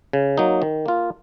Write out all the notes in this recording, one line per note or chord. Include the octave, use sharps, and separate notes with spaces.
C#3
F#3 A#3 D#4
D#3
A#3 F4